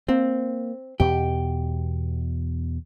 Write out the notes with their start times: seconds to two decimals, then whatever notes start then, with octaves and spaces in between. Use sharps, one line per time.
0.08 A#3 C4
1.00 E2 B2 G4